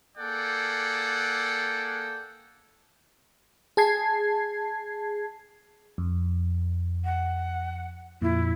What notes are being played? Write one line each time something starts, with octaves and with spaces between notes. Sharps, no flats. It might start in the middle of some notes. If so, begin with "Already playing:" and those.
A#3 G#4 A4 D5 F#5 G5
G#4 A5 G#6 C7
F2
F#5
F2 A#2 E4